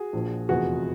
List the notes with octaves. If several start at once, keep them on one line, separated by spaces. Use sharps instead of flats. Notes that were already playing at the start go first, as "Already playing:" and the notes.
Already playing: F#4 G#4
A#1 A#2 F3
F1 E2 C3 F3 F#4 G#4